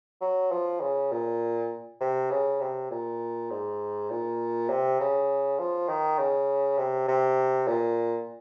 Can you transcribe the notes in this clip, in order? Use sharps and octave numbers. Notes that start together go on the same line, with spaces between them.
F#3
F3
C#3
A#2
C3
C#3
C3
A#2
G#2
A#2
C3
C#3
F3
D#3
C#3
C3
C3
A#2